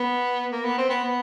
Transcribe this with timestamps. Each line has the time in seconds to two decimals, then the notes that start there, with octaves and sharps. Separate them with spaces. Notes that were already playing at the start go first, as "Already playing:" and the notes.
Already playing: B3
0.52 A#3
0.65 B3
0.78 C4
0.90 B3
1.04 B3